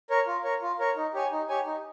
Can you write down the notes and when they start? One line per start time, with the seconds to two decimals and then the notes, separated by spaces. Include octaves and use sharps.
0.10 A#4 C#5
0.27 F4
0.44 A#4 C#5
0.62 F4
0.79 A#4 C#5
0.96 D#4
1.14 G4 C#5 G#5
1.32 D#4
1.49 G4 C#5 G#5
1.66 D#4